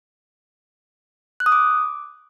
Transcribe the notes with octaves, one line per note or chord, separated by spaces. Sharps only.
F#6
D#6
D6